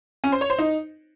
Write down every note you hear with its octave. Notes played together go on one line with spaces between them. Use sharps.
C#4
C5
C#5
C5
D#4